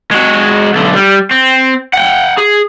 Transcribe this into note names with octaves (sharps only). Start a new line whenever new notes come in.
G#3 F#4
B1 D3
G3
C4
F#5 G5
G#4